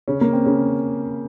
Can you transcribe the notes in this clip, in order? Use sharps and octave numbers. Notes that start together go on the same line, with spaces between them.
C#3 C#4
A#3
C4
C#3 C#4